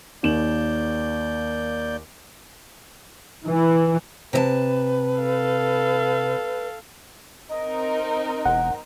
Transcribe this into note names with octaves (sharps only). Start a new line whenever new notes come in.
D#2 A#3 D5 G6 E7 F#7
E3
C3 B4 D#5 A5
A4 F5
C4 D#4 A#4 D#5
E1 F#5